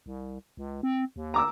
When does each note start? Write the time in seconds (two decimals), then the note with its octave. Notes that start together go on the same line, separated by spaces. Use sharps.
0.06 C2
0.57 C#2
0.83 C4
1.16 D#2
1.34 A#5 D6 E6